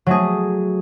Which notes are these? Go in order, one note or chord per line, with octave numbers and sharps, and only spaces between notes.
F#3 A3 G#4